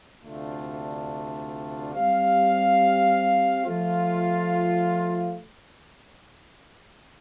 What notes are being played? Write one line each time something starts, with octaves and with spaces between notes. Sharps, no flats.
D2 C3 A3 D4 F4
G3 C4 G4 F5
F3 A3 F4